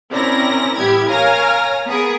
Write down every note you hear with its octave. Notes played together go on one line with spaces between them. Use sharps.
C4 C#4 E4 A#4 D5 A#6
A1 G3 B3 E4 G4 G#6
A#4 C#5 F5 G#5 F6 A#6
B3 G#4 A#4